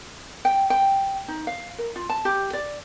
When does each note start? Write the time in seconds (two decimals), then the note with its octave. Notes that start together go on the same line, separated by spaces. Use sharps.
0.45 G5
0.70 G5
1.28 D#4
1.47 F5
1.78 A#4
1.96 F4
2.09 A5
2.25 G4
2.53 D5